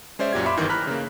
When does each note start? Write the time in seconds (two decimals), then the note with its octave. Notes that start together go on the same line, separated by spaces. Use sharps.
0.19 G#3 C#4 C5 D5 E5
0.32 F#2 A#2 G4 G#6
0.46 E5 B5 C6 D6
0.57 G1 D#3 E3
0.70 A#5 B5 F6 F#6 B6
0.87 C#3 A#3